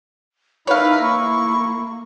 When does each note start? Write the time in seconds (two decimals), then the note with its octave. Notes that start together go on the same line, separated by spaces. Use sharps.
0.67 D#4 E4 A#4 B4 C#5 F5
1.03 A#3 C#6